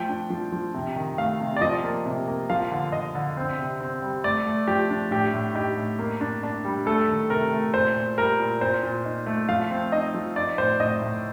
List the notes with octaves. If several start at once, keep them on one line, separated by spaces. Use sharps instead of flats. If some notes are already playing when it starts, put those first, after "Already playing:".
Already playing: F3 A3 G5
D4
F3
F3
C3
D#3
A3 F5
C3
D5
F3 D#5
A#3
C3
A#3
F3 F5
D3
D3 D#5
D3
C4
C3
C4
G3
A3 D5
A3
F3 G4
D4
A2 G4
A2
D#4 G4
A2
A#3
D4
D4
G3
A3 A4
D#3
C3 A#4
A3
A#2 C5
A#2
G3 A#4
A#2
A#2 C5
A#2
D#4
A3
F3 F5
C4
D#4 D#5
F3
D#4 D5
A2 C5
A2 D#5
A2